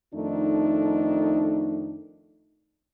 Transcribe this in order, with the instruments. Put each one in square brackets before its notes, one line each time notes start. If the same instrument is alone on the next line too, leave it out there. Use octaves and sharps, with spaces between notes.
[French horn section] F2 D#3 A3 D4 D#4